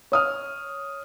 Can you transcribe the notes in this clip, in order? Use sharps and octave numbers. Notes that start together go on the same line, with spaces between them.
C#5 D#6 F6